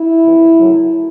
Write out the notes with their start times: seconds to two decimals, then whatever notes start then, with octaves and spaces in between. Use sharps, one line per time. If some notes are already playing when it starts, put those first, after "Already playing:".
Already playing: E4
0.23 F2 C3 E3
0.57 F#2 C#3 F#3 A3